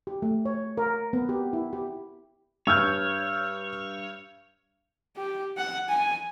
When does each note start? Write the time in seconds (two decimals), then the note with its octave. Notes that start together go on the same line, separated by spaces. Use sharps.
0.07 G4
0.22 A3
0.45 C#5
0.77 A#4
1.13 B3
1.29 G4
1.53 E4
1.73 G4
2.67 G2 C#5 E6 F6 G6
5.17 G4
5.57 F#5
5.89 G#5